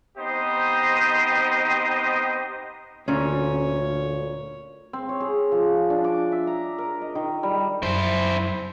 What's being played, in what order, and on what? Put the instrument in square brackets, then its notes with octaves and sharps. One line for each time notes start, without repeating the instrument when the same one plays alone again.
[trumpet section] B3 C4 D#4 G4 C5 D#5
[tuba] D2 [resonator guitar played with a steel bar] A#2 C#4 [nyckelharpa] C#5
[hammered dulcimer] C4
C#5
G#4
F3
D4
D6
E5
A#5
A#4
D#5
D#3
G3
[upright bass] F#2 [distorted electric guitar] E4 C5